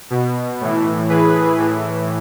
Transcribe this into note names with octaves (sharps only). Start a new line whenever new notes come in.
B2
A2 E3
A2 E3 G#4 B4
A2 E3